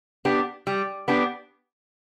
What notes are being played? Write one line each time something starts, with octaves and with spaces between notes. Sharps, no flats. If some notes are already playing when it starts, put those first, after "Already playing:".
B3 D4 G4
G3
B3 D4 G4